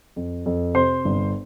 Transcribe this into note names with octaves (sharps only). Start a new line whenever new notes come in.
F2
F2
C3 C5 C6
G1